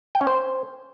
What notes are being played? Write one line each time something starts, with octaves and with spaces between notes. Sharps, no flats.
G5
C#4
C5